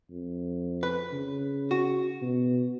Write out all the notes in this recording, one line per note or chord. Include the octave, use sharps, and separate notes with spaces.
F2
B4
C#3
F#4
B2